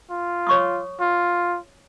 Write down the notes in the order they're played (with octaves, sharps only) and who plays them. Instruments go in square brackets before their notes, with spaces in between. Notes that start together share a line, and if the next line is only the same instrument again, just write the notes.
[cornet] F4
[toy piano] C#5 C#6 D#6
[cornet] F4